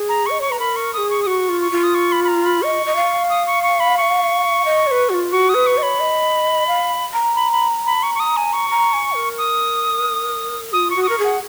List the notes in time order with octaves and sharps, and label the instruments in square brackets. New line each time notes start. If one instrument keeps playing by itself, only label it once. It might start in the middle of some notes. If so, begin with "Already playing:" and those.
Already playing: [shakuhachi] G#4
[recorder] A#5
[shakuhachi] D#5 [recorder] C#6
[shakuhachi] C#5 [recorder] C#6
[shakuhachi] B4 [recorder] A#5
[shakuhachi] A#4 [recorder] B5
[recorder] C#6
[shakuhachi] A#4 [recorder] D#6
[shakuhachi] G#4
[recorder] C#6
D#6
[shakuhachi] F#4 [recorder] C#6
[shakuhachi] F4
[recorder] C#6
[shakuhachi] F4
[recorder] D#6
C#6
B5
B5
A#5
B5
[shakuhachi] D#5 [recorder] C#6
[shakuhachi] D#5
F5
[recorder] D#6
C#6
C#6
B5
C#6
[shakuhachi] D#5
C#5
B4
F#4
F4
[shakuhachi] F#4 [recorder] C#6
[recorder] D#6
[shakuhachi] B4
[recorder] C#6
[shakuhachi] D#5
[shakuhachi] C#5 [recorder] B5
[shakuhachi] D#5
F5
A#5
[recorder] B5
B5
B5
C#6
C#6
D#6
G#5
C#6
[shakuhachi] A#5
G#5
A#4
[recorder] D#6
[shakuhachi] F4 [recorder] D#6
[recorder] C#6
[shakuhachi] F#4
[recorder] D#6
[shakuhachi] A#4 [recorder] C#6
[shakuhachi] G#4
[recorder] F#5